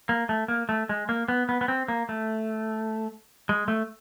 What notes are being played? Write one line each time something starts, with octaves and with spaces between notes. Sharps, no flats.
A#3
A3
A#3
A3
G#3
A#3
B3
B3
B3
C4
A#3
A3
G#3
A3